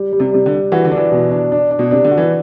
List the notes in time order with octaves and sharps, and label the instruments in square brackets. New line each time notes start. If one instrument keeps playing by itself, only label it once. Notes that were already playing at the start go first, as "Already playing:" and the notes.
Already playing: [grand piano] G3
G3
[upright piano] C3
[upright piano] C3 [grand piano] G3
[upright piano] D3
[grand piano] G3
[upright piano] E3 [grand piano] F#4
[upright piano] D3
[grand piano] D4
[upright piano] E3
[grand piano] B2
D4
D4
D4
[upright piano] B2
[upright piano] C3 [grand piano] D4
[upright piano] D3
[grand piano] F#4
[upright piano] E3